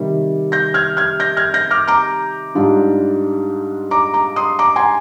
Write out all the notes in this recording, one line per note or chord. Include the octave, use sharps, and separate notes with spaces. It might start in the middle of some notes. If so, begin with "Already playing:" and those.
Already playing: C3 D#3 G3
G6 A#6
F6 G#6
F6 G#6
G6 A#6
F6 G#6
G6 A#6
D6 F6
A#5 D6
G#2 G3 D4 F4
A#5 D6
A#5 D6
C6 D#6
A#5 D6
G#5 C6